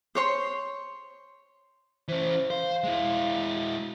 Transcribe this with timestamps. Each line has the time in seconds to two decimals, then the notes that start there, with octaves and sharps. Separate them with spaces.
0.15 C5 C#5 C6
2.08 E3 C#4 C5
2.50 C5 F5
2.84 G#3 E4
3.55 F#4